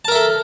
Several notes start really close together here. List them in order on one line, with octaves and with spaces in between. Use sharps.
A5 A#4 E5 A4